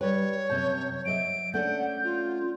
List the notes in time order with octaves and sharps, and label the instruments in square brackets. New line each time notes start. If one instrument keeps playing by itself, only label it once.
[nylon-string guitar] G3 G4 B4 [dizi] C#5
[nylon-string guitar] F#2 C3 A5 [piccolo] G6
[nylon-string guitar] F#3 D#5 E5 [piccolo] D7
[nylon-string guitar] A3 C#4 D4 [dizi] F#5 [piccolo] G6
[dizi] F4